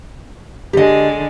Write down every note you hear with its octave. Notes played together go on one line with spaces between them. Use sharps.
D3 G#3 G4 D#5